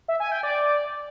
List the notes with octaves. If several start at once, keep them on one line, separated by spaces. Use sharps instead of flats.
E5
G#5
G5
D5